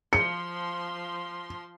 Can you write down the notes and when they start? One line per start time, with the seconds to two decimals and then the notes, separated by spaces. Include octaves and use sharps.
0.13 F3 C6 C#7